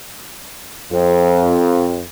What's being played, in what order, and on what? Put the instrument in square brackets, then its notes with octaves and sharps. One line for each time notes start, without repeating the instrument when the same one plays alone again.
[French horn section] F2